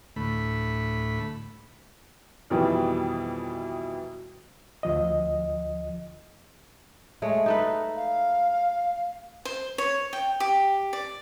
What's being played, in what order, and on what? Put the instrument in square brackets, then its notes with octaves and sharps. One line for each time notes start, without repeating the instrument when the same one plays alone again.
[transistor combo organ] D2 A2 A3 B5
[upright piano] F2 B2 D#3 E3 G3
[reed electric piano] D2 F3 D#5
[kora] G#3 A3 C#5
D#4 A4 B4
[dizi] F5
[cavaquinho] C5
C#5
G5
G4
D5